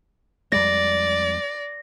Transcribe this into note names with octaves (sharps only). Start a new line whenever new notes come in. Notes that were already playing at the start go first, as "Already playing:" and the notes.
F2 G3 G#3 D5 A#6